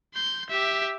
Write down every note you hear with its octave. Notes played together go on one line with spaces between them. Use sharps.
C6 G6
G4 E5